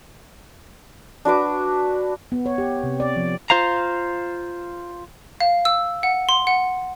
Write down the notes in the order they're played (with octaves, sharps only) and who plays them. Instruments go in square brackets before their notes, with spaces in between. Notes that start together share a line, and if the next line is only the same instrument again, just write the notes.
[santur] D4 F#4 B4 D6
[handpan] B3
C#5
G4
C3
D5
F3
[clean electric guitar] F4 C5 F5 A#5
[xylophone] F5
E6
F#5
C6
F#5